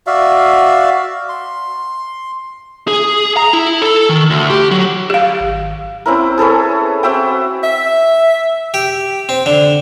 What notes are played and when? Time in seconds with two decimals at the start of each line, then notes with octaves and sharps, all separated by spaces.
0.07 F#4 D5 E5 F5
1.29 C6
2.88 G#4
3.37 A#5
3.53 E4
3.82 A4
4.09 D#3
4.30 D2
4.50 G4
4.71 F#3
5.10 G4 F5
5.40 G#1
6.06 C4 C#4 E4 A#4
6.38 G#4 A4 B4 C#5
7.03 C4 F#4 E5 G5
7.64 E5
8.74 G4
9.29 C4
9.46 D3